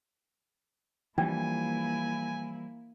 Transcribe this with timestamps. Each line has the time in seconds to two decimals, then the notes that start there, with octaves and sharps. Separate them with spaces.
1.18 E3 F3 G3 A#3 D4 E4 G#5